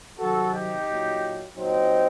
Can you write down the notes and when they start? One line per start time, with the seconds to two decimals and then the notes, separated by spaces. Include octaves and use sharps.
0.18 C3 D#3 F#3 F#4 A4
0.52 D#4 G4
0.87 A#2 F#3
1.55 A#2 F#3 C4 D#4